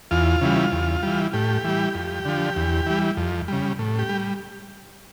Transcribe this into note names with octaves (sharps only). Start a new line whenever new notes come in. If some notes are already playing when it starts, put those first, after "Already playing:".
E2 F4
C#3 E3 G3
E2
E3 G3
A2 G4
E3 G3
F2
D3 F3
E2
E3 G3
F2
C#3 G3
A2
G4
G3